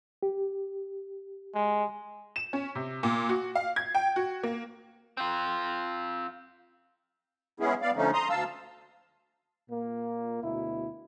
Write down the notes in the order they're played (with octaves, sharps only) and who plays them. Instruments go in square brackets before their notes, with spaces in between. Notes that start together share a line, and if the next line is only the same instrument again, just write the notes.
[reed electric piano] G4
[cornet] G#3
[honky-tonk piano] E7
C#4
C3
A#2
F#4
F5
G#6
G5
F#4
A#3
[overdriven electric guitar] C4 F4
[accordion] G#3 B3 C#4 E4 G#4
B3 D5 F5
D3 F3 A3 C#4 D#4
A#5 C6 D#6
D2 F5 A5 E6
[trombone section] A#2 A#3
D2 B2 E4